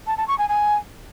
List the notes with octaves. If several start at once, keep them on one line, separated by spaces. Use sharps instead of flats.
A5
A5
C#6
G#5
G#5